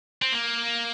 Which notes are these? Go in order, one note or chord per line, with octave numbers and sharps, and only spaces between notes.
C4
A#3